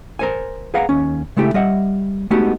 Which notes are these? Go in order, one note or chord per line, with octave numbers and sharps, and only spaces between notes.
A#4 C5 G#5
G#4 B4 F5 F#5 A#5
D#2 C#4
C#3 G#3 A3 E4 G4
G3 D#5 E5 F#5
G#3 A3 B3 D#4 F#4 G4